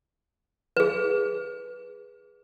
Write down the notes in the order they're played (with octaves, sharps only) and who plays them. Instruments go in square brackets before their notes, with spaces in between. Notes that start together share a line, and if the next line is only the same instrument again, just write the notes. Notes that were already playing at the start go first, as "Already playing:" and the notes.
[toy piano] G#4 B4